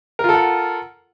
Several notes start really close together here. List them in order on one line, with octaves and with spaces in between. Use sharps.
A#4 F4 A4 F#5